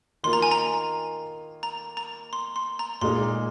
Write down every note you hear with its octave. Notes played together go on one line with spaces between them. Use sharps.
D#3 A#3 F4 C6
A#5
G#5
A#5
A#5
A#5
C6
C6
A#5
A#2 G#3 D#4 C6